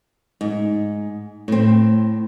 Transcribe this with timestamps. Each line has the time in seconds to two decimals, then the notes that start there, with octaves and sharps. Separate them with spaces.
0.41 G#2
1.48 A2 C4